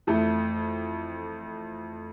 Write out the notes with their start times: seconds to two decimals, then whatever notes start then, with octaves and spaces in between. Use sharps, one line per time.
0.07 F2 E3 A3